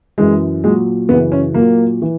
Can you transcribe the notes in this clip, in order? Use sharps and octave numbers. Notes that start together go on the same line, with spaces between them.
F#2 E3 G#3
A#2 F#3 G#3
F#2 C#3 E3 B3
C#4
A#2 F#3 A#3
E3